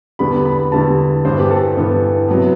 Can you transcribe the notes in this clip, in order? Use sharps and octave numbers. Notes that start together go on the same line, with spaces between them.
E2 D3 G3 B3 B5
B5
E2 D3 G3 B3 A5
G2 E3 B3 C5
G4
A4
G2 E3 B3
C3 F#3 B3